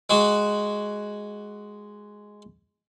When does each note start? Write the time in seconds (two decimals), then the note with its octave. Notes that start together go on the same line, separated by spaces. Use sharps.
0.10 G#3 F#4